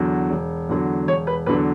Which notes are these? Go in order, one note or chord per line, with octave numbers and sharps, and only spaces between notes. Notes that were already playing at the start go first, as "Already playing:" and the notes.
Already playing: E2 D3 F#3
E1
E2 D3 F#3
E1 C#5
B4
E2 D3 F#3 B4